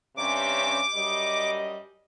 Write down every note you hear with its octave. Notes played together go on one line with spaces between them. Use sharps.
G2 C3 C#4 D6
F#2 G3 D#5